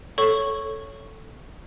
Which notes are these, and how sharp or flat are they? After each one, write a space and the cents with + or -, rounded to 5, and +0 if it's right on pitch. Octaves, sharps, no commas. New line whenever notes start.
A4 +0 C#5 +0 C#6 -5